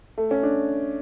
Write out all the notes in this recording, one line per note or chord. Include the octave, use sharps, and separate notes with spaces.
A3
C#4
D4